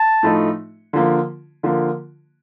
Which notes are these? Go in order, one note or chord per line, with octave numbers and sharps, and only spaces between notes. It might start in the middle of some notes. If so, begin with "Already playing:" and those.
Already playing: A5
A2 F3 A3 D#4
D3 F3 A#3
D3 F3 A#3